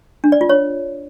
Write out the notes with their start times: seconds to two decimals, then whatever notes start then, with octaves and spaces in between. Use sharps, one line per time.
0.24 D4
0.32 D5
0.41 F4
0.49 C#5